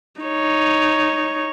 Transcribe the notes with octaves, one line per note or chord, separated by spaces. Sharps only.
D#4 C#5